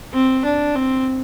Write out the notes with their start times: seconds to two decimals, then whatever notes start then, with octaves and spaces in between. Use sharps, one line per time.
0.13 C4
0.45 D4
0.76 C4